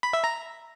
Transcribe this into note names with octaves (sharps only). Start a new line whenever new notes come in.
B5
E5
A#5